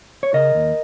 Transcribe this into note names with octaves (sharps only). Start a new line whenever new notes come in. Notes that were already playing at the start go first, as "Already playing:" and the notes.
C#5
C#3 A#4 D#5
D#2